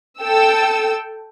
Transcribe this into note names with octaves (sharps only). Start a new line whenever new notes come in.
A4 G5 E6